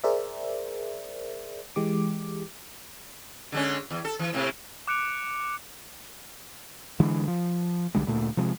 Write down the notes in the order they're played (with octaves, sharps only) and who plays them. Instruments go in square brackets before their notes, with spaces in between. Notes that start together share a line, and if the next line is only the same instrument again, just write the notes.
[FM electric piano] G#4 A#4 C5 D5 E5
E3 G#3 G4 D6
[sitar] D3 G#3 C#4
E2
A4
E3
A2 C3 A#3
[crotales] D6 F#6 C#7 D7 F7
[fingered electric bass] D3 E3 G#3
F3
C2 D3 G3 G#3
D2 A#2 A3
C3 F3 G#3